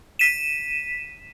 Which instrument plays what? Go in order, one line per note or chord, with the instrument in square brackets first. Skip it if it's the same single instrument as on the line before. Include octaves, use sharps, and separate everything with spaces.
[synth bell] B6 D#7 E7